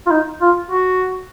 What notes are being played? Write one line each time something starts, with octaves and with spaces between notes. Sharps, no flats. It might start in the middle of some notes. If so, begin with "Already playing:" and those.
F4
D#4
F4
F#4